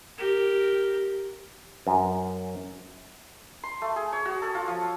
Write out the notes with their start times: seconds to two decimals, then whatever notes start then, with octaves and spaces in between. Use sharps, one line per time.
0.18 G4 A#4
1.87 F#2
3.64 C6
3.82 A3
3.96 G#4
4.12 C#5
4.25 F#4
4.42 A4
4.55 F4
4.68 F3